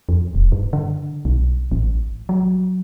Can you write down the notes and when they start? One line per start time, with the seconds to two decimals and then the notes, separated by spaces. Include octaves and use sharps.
0.09 F2
0.35 D#1
0.52 G2
0.73 D3
1.25 B1
1.72 A1
2.29 F#3